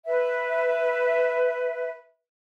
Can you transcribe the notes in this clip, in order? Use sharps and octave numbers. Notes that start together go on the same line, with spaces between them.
B4 E5